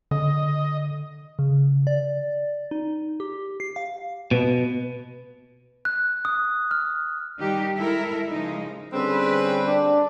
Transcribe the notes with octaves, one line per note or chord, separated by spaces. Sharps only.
D3 D#5
C#3
D5
D#4
G4
C7
F5
B2
F#6
D#6
F6
D#3 G3 D#4 G4
G#3 E4 A4 A#4
C#3 F3 G#3 D#4
D3 G3 C4 C#4 G#4 B4
D4